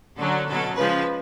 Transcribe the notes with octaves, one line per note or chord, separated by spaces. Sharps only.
D3 F#3 C#4 A4
B2 F#3 C#4 A4
C#3 F3 G#3 B4